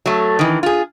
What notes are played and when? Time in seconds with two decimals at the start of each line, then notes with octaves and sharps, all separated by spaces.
0.06 F#3 A3
0.39 D#3 E3
0.63 F4 G#4